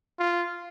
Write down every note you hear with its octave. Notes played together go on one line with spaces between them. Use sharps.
F4